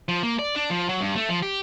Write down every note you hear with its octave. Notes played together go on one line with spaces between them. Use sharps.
F3
A#3
D5
D4
F3
F#3
G2
A3
F3
G4